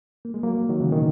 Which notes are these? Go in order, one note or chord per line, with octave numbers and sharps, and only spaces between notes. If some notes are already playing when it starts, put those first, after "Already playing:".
A#3
G#3
F#3 A#3
D#3 F#3
C#3 E3
B2 D#3